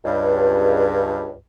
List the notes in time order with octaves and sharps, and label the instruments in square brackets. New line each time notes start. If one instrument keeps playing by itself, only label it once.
[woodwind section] C#2 G2